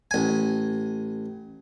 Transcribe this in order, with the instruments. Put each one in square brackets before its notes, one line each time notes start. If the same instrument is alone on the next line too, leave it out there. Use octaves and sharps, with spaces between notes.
[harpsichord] A1 G#5